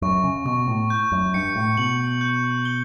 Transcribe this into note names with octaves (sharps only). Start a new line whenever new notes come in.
F#2 C#6
C#3
B2 C#6
A2
G6
F#2
G2 C#7
A2
B2 F#7
G6
G7